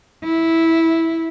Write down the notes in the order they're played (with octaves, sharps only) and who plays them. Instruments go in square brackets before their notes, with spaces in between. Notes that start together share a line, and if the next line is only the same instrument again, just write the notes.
[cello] E4